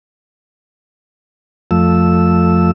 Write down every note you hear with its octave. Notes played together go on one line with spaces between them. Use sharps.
F2 F3 A3 E6